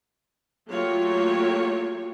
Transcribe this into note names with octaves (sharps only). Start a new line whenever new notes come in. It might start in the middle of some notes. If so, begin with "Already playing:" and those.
F#3 A3 A#3 F4 G4 C#5